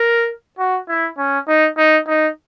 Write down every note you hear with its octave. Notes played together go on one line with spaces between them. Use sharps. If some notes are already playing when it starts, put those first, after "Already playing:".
Already playing: A#4
F#4
E4
C#4
D#4
D#4
D#4